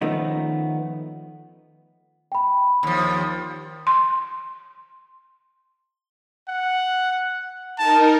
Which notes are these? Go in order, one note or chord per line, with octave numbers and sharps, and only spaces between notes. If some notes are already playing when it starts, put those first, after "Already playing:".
D#3 F3 A3 B3 C#4 D#4
G5 B5
D#2 F3
C6
F#5
D#4 A#4 A5